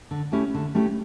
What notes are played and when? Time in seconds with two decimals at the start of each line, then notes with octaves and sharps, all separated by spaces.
0.11 D3
0.32 A3 C#4 E4 G4
0.54 D3
0.75 A3 C#4 E4 G4